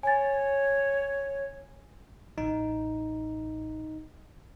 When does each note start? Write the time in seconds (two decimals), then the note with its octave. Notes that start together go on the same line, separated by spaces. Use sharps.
0.03 C#5 G#5 A6
2.38 A1 D#4